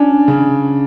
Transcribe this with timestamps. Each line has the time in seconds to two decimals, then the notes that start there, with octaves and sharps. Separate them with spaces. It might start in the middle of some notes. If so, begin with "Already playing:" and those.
Already playing: C#4 D4
0.28 C#3